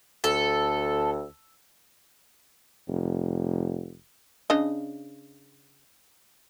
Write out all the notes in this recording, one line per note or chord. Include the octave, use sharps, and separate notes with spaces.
D2 A4
F1
C#3 D4 D#5